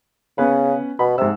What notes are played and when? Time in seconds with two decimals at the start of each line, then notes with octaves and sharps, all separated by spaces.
0.38 C#3 B3 C#4 B4
0.99 B2 B5
1.18 G#2 C3 E6